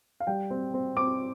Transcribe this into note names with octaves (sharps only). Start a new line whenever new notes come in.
F5
G3 G5
C4
C4
C4 D6